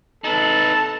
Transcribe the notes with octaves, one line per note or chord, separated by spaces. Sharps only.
D#4 A4 B4 A5